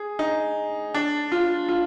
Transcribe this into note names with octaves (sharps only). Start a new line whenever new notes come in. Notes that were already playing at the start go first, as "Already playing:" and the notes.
Already playing: G#4
D#4
D4
F4
F4